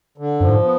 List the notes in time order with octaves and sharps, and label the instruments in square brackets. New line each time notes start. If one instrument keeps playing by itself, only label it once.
[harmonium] D3
[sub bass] F#2 [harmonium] F3
[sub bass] G#2
[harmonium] B3